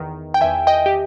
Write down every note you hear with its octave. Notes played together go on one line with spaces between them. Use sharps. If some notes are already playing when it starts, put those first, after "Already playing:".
Already playing: E2 D#3
G5
E2 D#3 E5 G#5
D#5 G5
G4